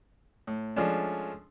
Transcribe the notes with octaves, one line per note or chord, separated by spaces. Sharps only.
A2
F3 G#3 A3 C#4 D4